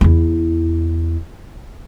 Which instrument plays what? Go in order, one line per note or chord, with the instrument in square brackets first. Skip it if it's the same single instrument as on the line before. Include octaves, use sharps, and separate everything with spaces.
[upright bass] E2 E4